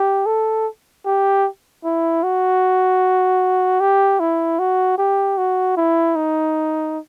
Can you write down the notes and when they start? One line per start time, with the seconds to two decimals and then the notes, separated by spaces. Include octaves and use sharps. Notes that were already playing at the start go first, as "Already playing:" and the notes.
Already playing: G4
0.26 A4
1.06 G4
1.84 E4
2.23 F#4
3.80 G4
4.20 E4
4.59 F#4
4.98 G4
5.38 F#4
5.77 E4
6.16 D#4